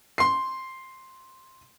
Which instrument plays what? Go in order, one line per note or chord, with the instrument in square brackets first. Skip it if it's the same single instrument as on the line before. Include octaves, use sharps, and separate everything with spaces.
[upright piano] C6 C7